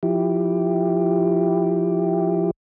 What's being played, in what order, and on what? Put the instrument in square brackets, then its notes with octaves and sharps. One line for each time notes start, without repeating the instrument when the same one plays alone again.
[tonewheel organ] F3 E4 G4